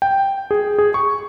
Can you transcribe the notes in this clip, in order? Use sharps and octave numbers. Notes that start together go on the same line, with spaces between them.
G5
G#4
G#4
C#6